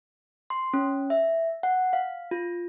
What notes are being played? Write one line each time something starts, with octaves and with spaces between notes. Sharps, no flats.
C6
C#4
E5
F#5
F5
F4